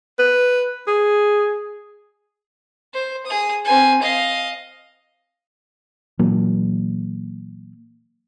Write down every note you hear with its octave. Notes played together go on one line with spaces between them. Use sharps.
B4
G#4
C5
G#4 D#6
C4 G#5
D#5 F5
A#2 E3 F#3 A#3